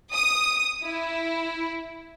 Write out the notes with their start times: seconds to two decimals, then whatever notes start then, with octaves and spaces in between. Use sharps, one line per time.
0.12 D#6
0.84 E4